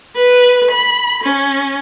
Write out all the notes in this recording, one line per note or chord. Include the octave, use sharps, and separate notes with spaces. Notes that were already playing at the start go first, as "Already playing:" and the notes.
B4
B5
C#4